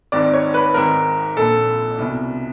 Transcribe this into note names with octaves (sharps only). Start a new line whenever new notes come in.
G#1 G#2 D#3 D5
C#5
B4
G#1 G#2 D#3 A#4
A#1 A#2 A4
C2 B2